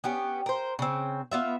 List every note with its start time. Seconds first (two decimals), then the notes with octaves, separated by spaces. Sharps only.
0.04 B3 C#4 G4
0.46 A#4 C5
0.79 C#3 C4
1.31 B3 F4 E5